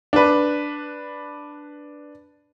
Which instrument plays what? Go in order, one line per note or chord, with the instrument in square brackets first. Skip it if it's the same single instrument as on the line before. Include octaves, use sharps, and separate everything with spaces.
[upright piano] D4 B4